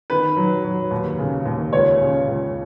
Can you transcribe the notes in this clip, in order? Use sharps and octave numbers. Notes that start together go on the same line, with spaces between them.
D#3 B4
F#3
F#3
D#2
C#3
D#2
C#2 C#5
C#3
C#2